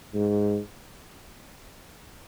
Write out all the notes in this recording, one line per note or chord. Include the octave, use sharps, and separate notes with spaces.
G#2